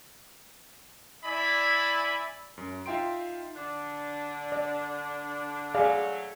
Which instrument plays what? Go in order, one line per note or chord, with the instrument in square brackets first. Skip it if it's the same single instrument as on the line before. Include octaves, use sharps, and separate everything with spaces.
[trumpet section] E4 D5 E5 G#5 B5
[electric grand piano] F#2
D#4 F4 E5 G5 C6 D7
[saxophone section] D3 D4
[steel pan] D5
[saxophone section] F#3 A3 [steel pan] G#4 D5 F5